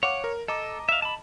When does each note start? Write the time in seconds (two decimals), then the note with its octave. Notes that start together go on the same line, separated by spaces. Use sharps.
0.03 C#5 F5 F#5 D6
0.24 A#4
0.48 A4 D#5 A#5 D6
0.89 E5 F5
1.02 A5 B5